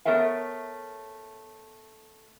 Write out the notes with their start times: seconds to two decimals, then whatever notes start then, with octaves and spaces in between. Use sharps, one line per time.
0.05 A3 B3 A#4 C#5 E5 F5